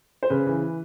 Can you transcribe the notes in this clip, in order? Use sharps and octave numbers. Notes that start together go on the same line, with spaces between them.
C5
C#3 B4
E3